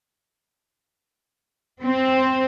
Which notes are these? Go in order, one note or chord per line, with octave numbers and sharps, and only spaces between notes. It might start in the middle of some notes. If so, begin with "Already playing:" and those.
C4